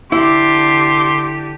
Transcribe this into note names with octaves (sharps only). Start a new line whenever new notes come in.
D3 E4 G4 C6 D6